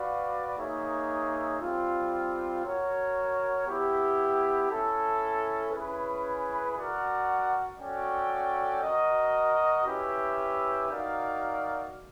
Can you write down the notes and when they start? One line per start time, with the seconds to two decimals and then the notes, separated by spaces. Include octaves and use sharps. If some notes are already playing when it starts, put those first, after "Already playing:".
Already playing: F#4 B4 D5 F5
0.57 A#3 D#4 G#4 C#5 E5
1.60 G3 C4 F4
2.64 F#4 A#4 C#5
3.66 B3 E4 G4
4.69 C#4 E4 A4
5.72 C#4 E4 G#4 B4
6.76 F#4 A#4 D5 F#5
7.78 C#4 F#4 A4 D5 G5
8.81 F#4 A#4 D#5
9.85 C#4 E4 G4 B4 E5
10.88 D#4 F#4 A#4 D5 F5